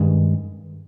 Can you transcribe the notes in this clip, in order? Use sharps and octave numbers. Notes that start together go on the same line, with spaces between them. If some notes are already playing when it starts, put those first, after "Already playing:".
Already playing: G2 D#3 G#3 C#4